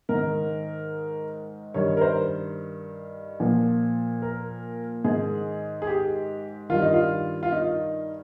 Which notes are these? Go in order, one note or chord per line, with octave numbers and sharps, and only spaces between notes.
G#2 D#3 A#4
G2 D#3 C#5
A#4
C5
A#2 F3
A#4
G#2 D#3 G#4
G#4
G4
G2 D#3 F4
D#4
F4
F4
D#4